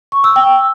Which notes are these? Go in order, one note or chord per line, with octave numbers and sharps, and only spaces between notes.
C#6
E6
G5